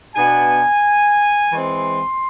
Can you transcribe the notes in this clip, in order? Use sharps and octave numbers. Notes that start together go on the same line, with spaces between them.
B2 B3 D4 G#5
E3 G#3 C4 C6